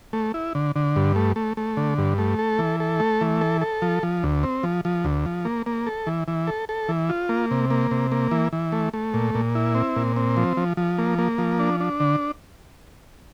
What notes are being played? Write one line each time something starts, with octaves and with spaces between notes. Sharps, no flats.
A3
E4
D3
D3
G2
A3
A3
A3
D3
G2
A3
A4
E3
A4
A3
E3
A4
A4
F3
F3
D2
C4
F3
F3
D2
F3
A#3
A#3
A4
E3
E3
A4
A4
E3
F4
A#3
C3
A#3
C3
A#3
E3
E3
A3
A3
A#2
A#2
E4
C4
A#2
C4
F3
F3
F3
A#3
A#3
F3
D4
D4
D3